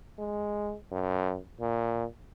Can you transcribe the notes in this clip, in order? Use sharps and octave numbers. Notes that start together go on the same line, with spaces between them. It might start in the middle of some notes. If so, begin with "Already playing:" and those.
G#3
F#2
A#2